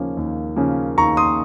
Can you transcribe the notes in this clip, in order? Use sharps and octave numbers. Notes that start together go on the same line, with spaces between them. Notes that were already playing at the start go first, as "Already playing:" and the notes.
Already playing: D#2 C#3 F3 A#3 C#4
D#2
C#3 F3 A#3 C#4
D#2 A#5 C#6
C6 D#6